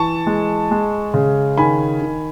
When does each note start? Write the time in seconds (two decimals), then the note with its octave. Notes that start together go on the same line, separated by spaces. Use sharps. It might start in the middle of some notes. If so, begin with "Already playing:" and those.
Already playing: E3 A5 C#6
0.27 G#3
0.71 G#3
1.14 C#3
1.58 D#3 G#5 B5
2.02 D#3